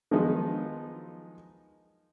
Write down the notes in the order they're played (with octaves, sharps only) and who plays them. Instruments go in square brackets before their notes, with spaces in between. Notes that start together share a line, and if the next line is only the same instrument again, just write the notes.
[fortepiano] D#3 F3 F#3 G#3 B3 D#4